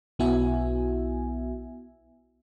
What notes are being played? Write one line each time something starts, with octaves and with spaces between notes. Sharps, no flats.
B1 B3 E4 F#4 E5 G#5